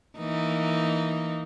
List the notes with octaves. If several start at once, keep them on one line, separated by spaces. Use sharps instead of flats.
E3 A#3 D#4